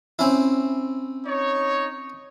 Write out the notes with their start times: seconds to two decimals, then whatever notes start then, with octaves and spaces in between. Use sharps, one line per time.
0.19 C4 C#4 E4
1.26 D#4 C#5